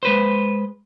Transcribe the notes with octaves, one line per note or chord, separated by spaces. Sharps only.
G#3 B4 C5